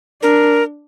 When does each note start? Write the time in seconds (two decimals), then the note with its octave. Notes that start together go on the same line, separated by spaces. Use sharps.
0.22 D4 A#4